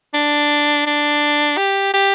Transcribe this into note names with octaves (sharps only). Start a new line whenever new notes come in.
D4
D4
G4
G4